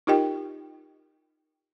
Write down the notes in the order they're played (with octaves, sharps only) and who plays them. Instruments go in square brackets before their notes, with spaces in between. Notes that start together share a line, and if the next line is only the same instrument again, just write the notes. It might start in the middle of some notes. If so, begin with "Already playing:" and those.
[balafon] D#4 F4 G4 A#4 D#5 G5